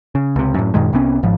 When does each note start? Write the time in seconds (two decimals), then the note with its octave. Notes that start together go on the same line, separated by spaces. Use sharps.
0.15 C#3
0.36 C#2 C3
0.54 F#2 A2
0.74 F#2 A#2 D#3 G#3
0.93 C2 C3 B3 C#4
1.23 G#1 G#2 F3